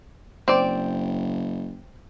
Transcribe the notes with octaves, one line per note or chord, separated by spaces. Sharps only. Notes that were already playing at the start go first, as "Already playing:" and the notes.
F#1 C4 D5